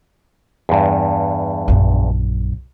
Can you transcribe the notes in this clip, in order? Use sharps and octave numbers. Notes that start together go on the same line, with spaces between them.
E2 G2
A#1 F#2